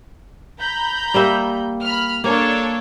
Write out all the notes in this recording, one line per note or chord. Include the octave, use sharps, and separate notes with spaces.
A#5 B5 G6
G3 A#3 E5
B5 F6
A#3 D4 A4 C#5